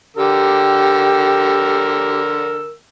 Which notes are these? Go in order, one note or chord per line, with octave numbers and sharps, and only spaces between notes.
D3 G4 A#4 E6